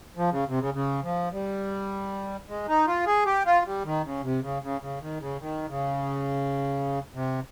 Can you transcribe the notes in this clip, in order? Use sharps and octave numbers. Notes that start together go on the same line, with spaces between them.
F3
C#3
C3
C#3
C#3
F3
G3
G#3
D#4
F4
G#4
G4
F4
G3
D#3
C#3
C3
C#3
C#3
C#3
D#3
C#3
D#3
C#3
C3